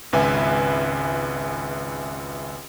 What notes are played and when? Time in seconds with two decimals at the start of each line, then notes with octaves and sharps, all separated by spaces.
0.12 G#1 C#2 B4 E5 G#5